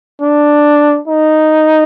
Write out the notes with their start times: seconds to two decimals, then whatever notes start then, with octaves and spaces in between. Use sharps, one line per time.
0.22 D4
1.08 D#4